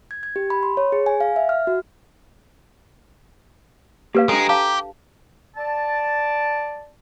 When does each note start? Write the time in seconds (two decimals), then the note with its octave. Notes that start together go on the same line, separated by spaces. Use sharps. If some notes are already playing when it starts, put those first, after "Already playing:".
0.11 G#6
0.23 G#6
0.36 G4
0.50 B5
0.63 C6
0.77 C#5
0.92 G#4
1.06 G#5
1.20 F5
1.36 E5
1.49 F6
1.67 F#4
4.15 A#3 G4 B4 F5
4.29 G#3 D4 A4 G5 A#5
4.49 G4 F5 A5
5.57 D5 A5